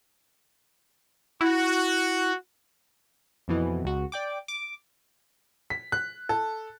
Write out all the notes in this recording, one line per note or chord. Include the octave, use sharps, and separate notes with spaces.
E4 F#4
F2 B2 E3
C#2 F#4
D5 G5 D6
D6
B6
F#6
A4